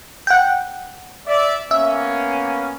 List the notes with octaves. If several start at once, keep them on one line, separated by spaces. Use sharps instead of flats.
F#5 G5
D5 E5
A#3 B3 C#4 E5